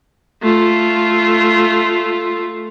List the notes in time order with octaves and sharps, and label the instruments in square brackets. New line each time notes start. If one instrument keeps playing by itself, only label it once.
[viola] A3 F4